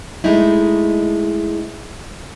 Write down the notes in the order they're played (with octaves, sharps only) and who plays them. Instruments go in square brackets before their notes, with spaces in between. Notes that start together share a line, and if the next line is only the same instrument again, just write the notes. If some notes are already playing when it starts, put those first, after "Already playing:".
[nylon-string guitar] G#3 A3 D#4 E4